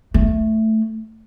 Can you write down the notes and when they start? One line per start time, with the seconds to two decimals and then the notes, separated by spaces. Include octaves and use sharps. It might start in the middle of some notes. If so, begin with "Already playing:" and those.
0.14 A3